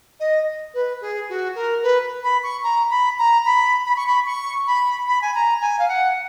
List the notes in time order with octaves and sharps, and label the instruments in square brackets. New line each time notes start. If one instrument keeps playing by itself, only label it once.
[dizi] D#5
B4
G#4
F#4
A#4
B4
B5
C#6
A#5
B5
A#5
B5
B5
C#6
B5
C#6
B5
B5
G#5
A#5
G#5
F5
F#5